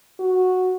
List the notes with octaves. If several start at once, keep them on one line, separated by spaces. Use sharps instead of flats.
F#4